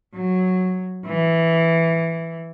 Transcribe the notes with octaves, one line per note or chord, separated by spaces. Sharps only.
F#3
E3